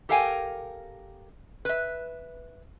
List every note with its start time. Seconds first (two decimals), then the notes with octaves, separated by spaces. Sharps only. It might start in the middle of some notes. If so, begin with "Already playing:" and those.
0.09 G4 A4 A#4 F5 G5 G#5
1.65 B4 E5